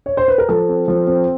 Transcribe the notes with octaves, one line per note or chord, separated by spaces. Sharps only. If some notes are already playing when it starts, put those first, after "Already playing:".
C#5
C5
B4
A#4
F3 A4
C4
F3
C4